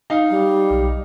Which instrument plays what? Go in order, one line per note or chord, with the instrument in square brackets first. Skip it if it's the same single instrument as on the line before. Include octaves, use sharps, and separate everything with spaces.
[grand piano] D#4 F5
[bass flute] G3
[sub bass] B1